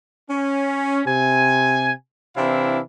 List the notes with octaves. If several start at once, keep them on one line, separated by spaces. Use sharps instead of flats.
C#4
C3 G#5
C3 E3 C4 D4 E4 F5